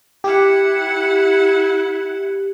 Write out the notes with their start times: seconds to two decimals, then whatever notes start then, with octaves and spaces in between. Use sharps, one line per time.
0.24 E4 G4 F#5